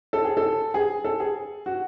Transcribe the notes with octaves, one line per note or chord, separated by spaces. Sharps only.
A4
G#4
A4
G#4
A4
G#4
F#4